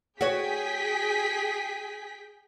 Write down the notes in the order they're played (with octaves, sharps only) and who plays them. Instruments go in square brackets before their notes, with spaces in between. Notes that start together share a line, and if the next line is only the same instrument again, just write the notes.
[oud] F#4 C#5 [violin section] G#4 G5 B6